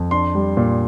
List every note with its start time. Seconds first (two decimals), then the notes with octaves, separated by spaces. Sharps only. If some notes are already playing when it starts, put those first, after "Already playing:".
Already playing: F2
0.11 D4 C6
0.35 G3
0.57 A#2